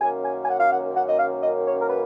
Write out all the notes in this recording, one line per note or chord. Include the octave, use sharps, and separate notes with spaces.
F#2 D#3 A#3 C#4 G#5
G#5
G#5
F#5
F5
F#5
F#5
D#5
F5
D#5
C#5
A#4
B4